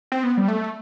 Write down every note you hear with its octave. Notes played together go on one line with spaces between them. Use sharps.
C4
B3
G3
A3